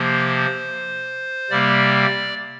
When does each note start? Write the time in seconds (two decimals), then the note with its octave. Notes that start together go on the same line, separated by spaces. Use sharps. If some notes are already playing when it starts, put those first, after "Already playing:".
Already playing: C3 F3 A#3 C5
1.50 C3 G3 A#3 D5